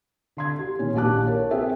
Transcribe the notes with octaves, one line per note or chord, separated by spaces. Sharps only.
D3 C6 G#6
G4
A#2 D#3 C#4
A#1 E4 G4 A5 D6 F#6
A#4 C#5
C4 G#4 E5 G5